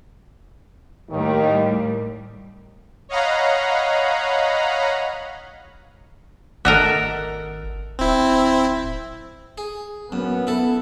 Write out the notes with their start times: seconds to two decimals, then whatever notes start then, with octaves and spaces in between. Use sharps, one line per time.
1.10 D#2 A2 D#3 G3
3.09 C#5 D#5 F5 F#5 A#5 B5
6.65 G#1 A4 A#4 D#5 E5 F#5
7.99 D1 C4 E4
9.58 G#4
10.12 F#2 B3
10.47 E4 A4